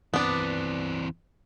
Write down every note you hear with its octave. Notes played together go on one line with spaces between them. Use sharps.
E3 B3 C4 D4